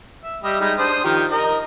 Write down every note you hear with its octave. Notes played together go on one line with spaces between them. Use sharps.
E5
G3 D#5 E5
G3 G#3 D#4
D4 C5 D#6
D#3 F3 G4
A#4 D#5